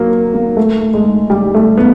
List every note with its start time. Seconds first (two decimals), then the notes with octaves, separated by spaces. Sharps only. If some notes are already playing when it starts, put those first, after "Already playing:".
Already playing: F#3 A#3
0.34 A#3
0.57 A3
0.94 G#3
1.30 G3
1.55 A3
1.78 B3